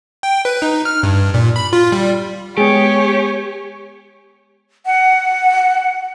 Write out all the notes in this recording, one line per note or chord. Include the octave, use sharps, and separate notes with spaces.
G5
B4
D#4
F6
G2
A#2
B5
F4
G3
G#3 B3 G4 G#4 C#5 G#5
F#5